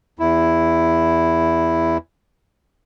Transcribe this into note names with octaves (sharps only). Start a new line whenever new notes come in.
E2 E4